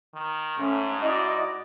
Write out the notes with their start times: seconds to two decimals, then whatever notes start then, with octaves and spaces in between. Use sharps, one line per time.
0.14 D#3
0.58 G#2 A3 C#4
1.01 E4 F#4 D5 D#5 D#6